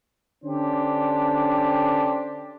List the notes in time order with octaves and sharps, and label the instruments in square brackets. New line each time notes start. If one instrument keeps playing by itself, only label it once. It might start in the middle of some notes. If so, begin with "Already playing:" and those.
[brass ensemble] D3 C#4 D4 G4 C5